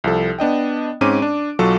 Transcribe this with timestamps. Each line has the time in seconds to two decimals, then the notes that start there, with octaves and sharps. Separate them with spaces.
0.04 C2 F3 A4
0.39 B3 D4 D#5 G5
1.01 G#2 C4 C#4 D6 D#7
1.22 D4
1.59 B1 F#3 F4 A4 C#6